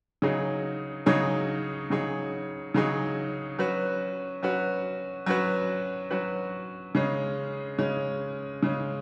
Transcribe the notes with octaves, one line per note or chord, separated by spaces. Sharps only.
C#3 F#3 D#4 G#4 C#5
C#3 F#3 D#4 G#4 C#5
C#3 F#3 D#4 G#4 C#5
C#3 F#3 D#4 G#4 C#5
F#3 C#4 F#4 B4
F#3 C#4 F#4 B4
F#3 C#4 F#4 B4
F#3 C#4 F#4 B4
C#3 G#3 C#4
C#3 G#3 C#4
C#3 G#3 C#4